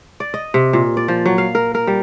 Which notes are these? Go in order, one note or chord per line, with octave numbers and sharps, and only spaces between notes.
D5
D#5
C3
A#2
D5
F3
F#3
F5
A#4
A#4
G3